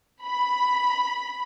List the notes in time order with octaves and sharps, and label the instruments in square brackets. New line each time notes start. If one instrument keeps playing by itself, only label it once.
[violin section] B5